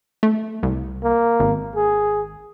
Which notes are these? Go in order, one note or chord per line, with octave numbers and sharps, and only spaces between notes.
A3
C2
A#3
G#1
G#4